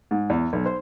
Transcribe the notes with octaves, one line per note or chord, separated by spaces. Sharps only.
G#2
E2
B1
C5